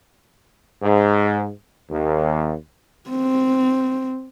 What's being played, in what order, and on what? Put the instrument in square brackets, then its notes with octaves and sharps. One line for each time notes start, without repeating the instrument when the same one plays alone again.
[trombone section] G#2
D#2
[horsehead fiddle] C4